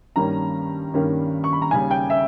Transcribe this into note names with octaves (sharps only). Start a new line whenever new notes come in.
G2 D#3 G3 A#3 C#4 A#5
G2 D#3 G3 A#3 C#4
C#6
B5
A#5
D#2 C#3 G3 G#5
G5
E5